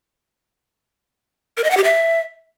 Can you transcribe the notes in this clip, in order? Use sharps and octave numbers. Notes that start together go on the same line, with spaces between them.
A#4
D#5
F#5
G4
E5